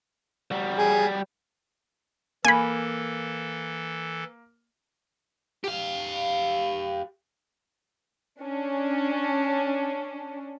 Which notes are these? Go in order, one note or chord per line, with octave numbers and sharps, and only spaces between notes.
G3 F#4
G#4
E3 A#3 A4 G#5 B5
G4 F5
C#4 D4